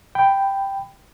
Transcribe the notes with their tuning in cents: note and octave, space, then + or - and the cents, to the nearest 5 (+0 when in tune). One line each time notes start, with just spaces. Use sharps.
G5 +0 B5 +15